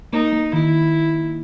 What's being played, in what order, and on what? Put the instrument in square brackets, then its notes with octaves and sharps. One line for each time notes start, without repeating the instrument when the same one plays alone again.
[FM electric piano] A#3 [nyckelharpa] D#4
[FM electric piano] A#3
[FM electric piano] D#3 [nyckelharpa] E4